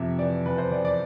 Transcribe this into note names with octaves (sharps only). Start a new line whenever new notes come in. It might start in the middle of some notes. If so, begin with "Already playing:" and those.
Already playing: F2 C3 E5
E3 D5
E2 B4
C5
E2 D5
D5